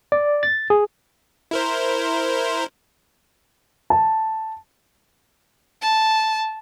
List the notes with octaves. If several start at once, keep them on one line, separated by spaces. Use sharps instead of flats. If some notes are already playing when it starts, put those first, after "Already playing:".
D5
A6
G#4
E4 A#4 C5
A5
A5